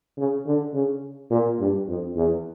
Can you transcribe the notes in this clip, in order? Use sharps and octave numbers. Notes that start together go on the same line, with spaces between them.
C#3
D3
C#3
A#2
G2
F2
E2